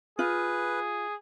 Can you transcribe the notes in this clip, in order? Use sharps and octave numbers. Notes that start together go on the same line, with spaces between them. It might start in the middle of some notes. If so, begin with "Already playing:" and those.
F4 G#4 B4